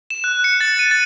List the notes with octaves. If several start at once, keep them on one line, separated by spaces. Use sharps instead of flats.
E7
F#6
C#7
A6
D#7
A6